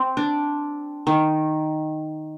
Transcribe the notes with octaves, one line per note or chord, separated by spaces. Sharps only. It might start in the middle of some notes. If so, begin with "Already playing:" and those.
Already playing: C4
D4
D#3